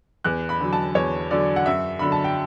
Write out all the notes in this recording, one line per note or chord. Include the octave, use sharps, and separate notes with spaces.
E2 F#6
B5
D3 F#3
A5
E2 C#5
D3 F#3 D5
F#5
F#2 E5
D3 F#3 B5
A5
G5